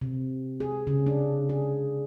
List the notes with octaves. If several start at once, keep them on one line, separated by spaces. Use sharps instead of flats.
C3
G#4
C#3
D4
G#4